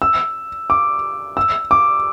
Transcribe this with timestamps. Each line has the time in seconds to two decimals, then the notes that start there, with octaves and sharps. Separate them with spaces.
0.02 E6
0.70 D6
1.37 E6
1.71 D6